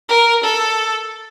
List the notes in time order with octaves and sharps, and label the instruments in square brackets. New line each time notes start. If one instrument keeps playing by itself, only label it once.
[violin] A#4
A4